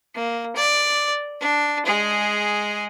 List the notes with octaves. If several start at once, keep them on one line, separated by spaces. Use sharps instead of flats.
A#3
D5
D4
G#3 G#4